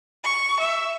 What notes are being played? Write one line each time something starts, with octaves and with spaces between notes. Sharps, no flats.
C#6
E5